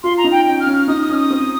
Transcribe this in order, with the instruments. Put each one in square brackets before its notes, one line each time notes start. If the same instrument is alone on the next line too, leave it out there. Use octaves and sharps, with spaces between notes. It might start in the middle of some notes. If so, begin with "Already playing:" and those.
[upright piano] F4 [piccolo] C6
[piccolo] A#5
[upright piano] D#4
[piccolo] G5
[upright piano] C#4 [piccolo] G5
[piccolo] F6
[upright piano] C#4
[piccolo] F6
[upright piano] D#4 [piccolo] D#6
[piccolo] D#6
[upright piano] C#4 [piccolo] F6
[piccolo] D#6
[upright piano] C4